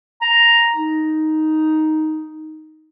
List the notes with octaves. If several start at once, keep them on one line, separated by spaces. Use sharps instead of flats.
A#5
D#4